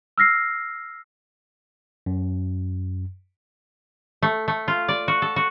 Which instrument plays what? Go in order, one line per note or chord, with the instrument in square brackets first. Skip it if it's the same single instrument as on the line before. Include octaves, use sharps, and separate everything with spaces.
[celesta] E6 F6 A#6 C7
[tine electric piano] F#2
[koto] A3
A3
F4
D5
F#4
A4
F#4